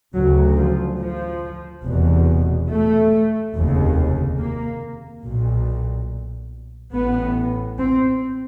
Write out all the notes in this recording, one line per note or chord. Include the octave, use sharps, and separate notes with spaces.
D2 C#3 F#3
F3
F3
F1 E2 B2
A3
F1 D#2 C#3
A#3
B1 A#2
A1 A2 B3
C4